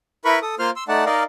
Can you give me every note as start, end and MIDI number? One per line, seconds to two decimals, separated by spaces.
0.25 0.39 64
0.25 0.39 70
0.25 0.39 71
0.25 0.39 83
0.25 0.39 85
0.42 0.55 69
0.42 0.55 87
0.59 0.70 58
0.59 0.70 65
0.59 0.70 72
0.59 0.70 84
0.59 0.70 89
0.76 0.84 84
0.76 0.84 88
0.88 1.05 57
0.88 1.05 63
0.88 1.05 74
0.88 1.05 78
0.88 1.05 81
1.06 1.24 63
1.06 1.24 70
1.06 1.24 74
1.06 1.24 75
1.06 1.24 77